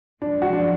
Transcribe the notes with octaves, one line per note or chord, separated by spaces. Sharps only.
G#1 F#2 F3 G#3 D4
F#4
D4